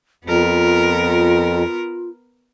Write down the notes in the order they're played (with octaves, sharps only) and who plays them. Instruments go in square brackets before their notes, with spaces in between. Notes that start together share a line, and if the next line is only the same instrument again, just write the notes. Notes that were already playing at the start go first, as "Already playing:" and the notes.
[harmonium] F2 [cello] B3 A#4 [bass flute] F4